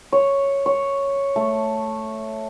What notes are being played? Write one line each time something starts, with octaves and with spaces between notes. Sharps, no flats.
C#5
C#5
A3